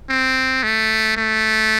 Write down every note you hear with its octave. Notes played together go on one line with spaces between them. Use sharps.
C4
A3
A3